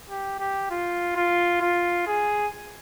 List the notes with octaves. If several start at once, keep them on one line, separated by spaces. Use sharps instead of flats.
G4
G4
F4
F4
F4
G#4